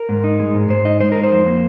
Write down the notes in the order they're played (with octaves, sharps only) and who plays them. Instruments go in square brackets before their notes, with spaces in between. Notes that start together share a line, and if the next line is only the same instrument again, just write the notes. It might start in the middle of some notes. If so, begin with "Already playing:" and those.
Already playing: [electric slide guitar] A#4
G#2
D#4
G#3
G#2
G#2 C5
D#4 D#5
G#3 C5
D#4 A#4
C5
F2
A#3